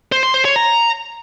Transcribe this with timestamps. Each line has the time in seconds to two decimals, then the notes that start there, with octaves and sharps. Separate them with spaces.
0.12 C5
0.23 C6
0.34 C5
0.45 C#5
0.56 A#5